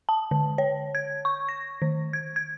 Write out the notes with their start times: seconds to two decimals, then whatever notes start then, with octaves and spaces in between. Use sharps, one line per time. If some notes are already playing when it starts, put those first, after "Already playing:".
0.09 A5
0.31 D3
0.58 C#5
0.95 G#6
1.25 C#6
1.49 A#6
1.82 D#3
2.13 G#6
2.36 G#6